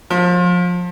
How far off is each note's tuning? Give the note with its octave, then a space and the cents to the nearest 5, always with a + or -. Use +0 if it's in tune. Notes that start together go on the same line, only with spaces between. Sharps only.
F3 +30